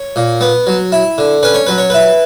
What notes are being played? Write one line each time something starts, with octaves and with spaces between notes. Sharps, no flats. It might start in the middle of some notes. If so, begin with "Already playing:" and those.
Already playing: C#5
A#2
B3
F#3
E4
D3
C#4 B4
C#5
F#3 B4
C#5
E4 B4